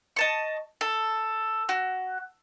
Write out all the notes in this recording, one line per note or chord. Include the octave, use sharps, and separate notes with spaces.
D#5 A5 C#6
A4
F#4